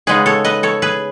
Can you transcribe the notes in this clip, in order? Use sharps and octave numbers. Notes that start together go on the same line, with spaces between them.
C#3 G#3 B3 D#4 G#4 B4
A4 C#5
B4 D#5
A4 C#5
G#4 B4